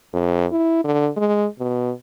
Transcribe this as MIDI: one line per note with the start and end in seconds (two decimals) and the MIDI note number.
0.13 0.46 41
0.51 0.82 64
0.84 1.09 50
1.17 1.46 56
1.59 1.91 47